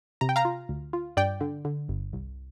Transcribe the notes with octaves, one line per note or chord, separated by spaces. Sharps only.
C3 A#5
G5
F5 A#5
F4
D2
F4
G2 D5 G5
D3
D3
G1
C2